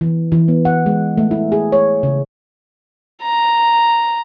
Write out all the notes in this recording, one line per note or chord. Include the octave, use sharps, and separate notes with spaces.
E3
E3
B3
F#5
G#3
A3
E4
G#4
C#5
C#3
A#5